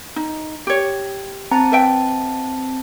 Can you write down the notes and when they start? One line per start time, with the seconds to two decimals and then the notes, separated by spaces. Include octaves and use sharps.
0.16 D#4
0.67 G4 C#5
1.51 C4 A5 A#5
1.72 B4 E5 G5